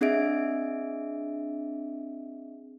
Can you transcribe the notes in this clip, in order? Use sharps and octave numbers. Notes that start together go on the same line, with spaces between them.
C4 D4 G#4 D#5 E5 D7